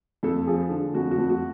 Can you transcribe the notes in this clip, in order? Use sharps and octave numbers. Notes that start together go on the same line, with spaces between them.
F2 A4
F3 G#4
D3
F2 F#4
F#4
F2
F#4